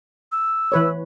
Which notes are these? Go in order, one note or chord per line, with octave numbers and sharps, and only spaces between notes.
E6
E3 B4 C#5